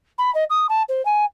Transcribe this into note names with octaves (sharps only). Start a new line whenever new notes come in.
B5
D#5
D#6
A5
C5
G#5